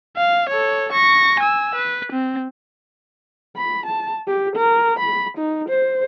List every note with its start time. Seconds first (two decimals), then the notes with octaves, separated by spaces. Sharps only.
0.17 F5
0.49 A4 C#5
0.93 C#6 A#6
1.40 G#5 E6
1.75 B4
2.13 C4
3.56 B5
3.86 A5
4.28 G4
4.56 A#4
5.00 B5
5.38 D#4
5.69 C5